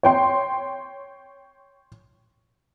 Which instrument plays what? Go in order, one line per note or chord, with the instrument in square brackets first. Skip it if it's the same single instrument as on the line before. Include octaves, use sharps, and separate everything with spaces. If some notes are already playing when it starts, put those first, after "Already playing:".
[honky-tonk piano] C#5 G5 C6